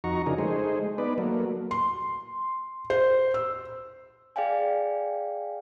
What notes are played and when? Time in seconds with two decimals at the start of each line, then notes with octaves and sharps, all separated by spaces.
0.04 F2 D#4 F#4 A#5 C#6
0.26 C#3 F3 D4 D#4 G#4 A#4
0.38 G#3 A3 D#4 G#4 C5
0.98 B3 D#4 B4 D5
1.18 F#3 A3 A#3
1.71 C6
2.90 C5
3.34 E6
4.36 G#4 D5 F5 G5 G#5